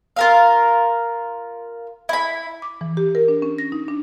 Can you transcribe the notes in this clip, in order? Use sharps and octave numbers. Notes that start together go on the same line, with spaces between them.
F4 A#4 F5
E4 B5
D6
E3
G4
A#4
D4
C#4
A#6
D#4
D4